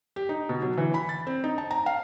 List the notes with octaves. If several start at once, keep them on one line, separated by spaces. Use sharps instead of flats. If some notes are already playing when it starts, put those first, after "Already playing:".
G4
D#4
B2
F#3
E3
B5
A6
C4
D#4
A5
A#5
F5